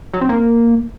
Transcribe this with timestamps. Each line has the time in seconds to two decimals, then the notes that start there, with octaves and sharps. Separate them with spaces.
0.13 F#3
0.21 C4
0.29 A#3